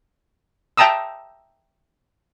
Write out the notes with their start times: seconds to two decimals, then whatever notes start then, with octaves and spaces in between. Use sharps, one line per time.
0.77 E5 G5 A5 A#5 D#6 E6